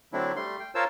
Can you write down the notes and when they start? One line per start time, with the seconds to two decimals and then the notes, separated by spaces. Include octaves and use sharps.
0.13 D3 F#3 A3 C4 D4 E4
0.36 G3 A3 C6
0.60 G5
0.75 F4 A#4 C5 C#5 A5 E6